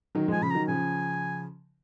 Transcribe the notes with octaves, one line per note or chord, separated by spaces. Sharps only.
D#3 F#3
F3 G#3
G#5
C#3 F3 B5
D#3 F#3 A#5
C#3 F3 G#5